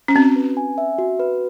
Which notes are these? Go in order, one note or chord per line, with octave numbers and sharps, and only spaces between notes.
C#4
C4 F#4
B4
G#5
E5
F#4
B4